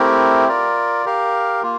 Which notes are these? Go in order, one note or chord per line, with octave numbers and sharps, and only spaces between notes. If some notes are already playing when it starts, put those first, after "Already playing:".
Already playing: A3 C4 E4 G4 A#4
F4 A#4 D5
G4 A#4 F5
A#3 F4